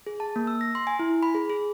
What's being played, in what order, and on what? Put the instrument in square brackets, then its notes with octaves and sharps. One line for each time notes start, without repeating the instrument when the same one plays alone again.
[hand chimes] G#4
A5
A#3
E6
A#6
C6
G#5
E4
B5
G#4
G#4